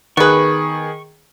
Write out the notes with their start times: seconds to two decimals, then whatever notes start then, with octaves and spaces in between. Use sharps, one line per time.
0.17 D#3 B3 G#4 B4 C#6